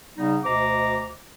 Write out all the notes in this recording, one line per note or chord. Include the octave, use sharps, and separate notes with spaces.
C#3 G3 B3 D#4
D2 B2 C5 D#5 A#5 D6